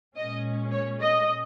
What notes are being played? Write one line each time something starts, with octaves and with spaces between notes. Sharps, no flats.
A#2 G#3 C#4 D#5
C#5
D#5